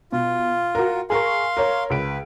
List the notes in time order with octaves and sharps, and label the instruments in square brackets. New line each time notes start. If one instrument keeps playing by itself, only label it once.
[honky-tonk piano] B2 [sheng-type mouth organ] F4
[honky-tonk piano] F#4 A#4
[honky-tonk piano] G#4 A#4 C#6 [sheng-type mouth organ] F5 C6
[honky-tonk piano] A#4 C#5
[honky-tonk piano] C#2 D7 [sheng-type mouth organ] B4